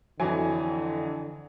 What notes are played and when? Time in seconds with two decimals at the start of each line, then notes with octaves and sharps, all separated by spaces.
0.20 F2 D3 E3 F#3 G#5